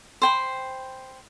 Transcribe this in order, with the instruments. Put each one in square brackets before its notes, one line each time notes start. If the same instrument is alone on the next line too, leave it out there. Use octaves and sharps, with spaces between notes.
[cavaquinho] C5 G5 B5